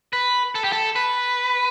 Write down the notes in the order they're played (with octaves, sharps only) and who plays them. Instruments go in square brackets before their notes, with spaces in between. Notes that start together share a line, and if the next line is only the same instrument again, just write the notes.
[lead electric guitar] B4
A4
G4
A4
B4